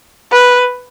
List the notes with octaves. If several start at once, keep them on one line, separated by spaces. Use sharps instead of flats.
B4